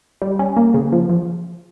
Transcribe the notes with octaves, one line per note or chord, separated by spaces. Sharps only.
G3
C#4
A#3
C#3
F3
F3